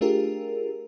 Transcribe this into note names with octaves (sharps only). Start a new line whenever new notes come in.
A3 D4 F4 G4 G#4 A#4